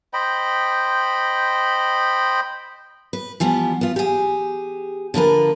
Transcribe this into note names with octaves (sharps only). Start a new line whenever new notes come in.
C5 D#5 G5 B5
B4
E3 F3 G3 B3
B3 F4
G4 G#4
D3 F3 A#4 B4